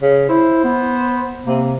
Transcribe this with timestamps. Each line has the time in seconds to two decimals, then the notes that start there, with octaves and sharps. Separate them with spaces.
0.02 C#3
0.29 E4 C5
0.64 B3
1.46 C3 A#3